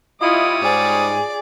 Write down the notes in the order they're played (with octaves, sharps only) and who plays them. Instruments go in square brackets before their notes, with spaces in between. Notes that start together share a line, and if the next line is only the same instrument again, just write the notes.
[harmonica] G3 C#5 D#6 [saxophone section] E4 D#5 [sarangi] F4
[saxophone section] G#2 [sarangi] G#4 [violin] D5